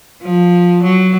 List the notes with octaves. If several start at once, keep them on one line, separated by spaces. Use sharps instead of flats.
F3
F#3